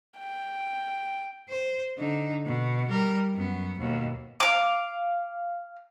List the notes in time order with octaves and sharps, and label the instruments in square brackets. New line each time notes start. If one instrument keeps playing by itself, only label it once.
[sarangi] G5
[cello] C5
D3 D#4
B2
G3 A#4
F#2 B3
D#2 B2
[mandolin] F5 D6